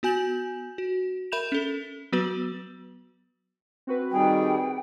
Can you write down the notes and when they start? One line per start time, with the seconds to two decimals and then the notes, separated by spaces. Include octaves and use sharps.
0.03 B3 F#4 G#5 G6 F#7
0.78 F#4
1.32 A#4 E5 B5 G6 E7 F7
1.52 C#4 A4
2.12 F#3 B3 F#4 B4 F#7
3.87 C4 F#4 B4
4.12 D#3 G3 G#4 G5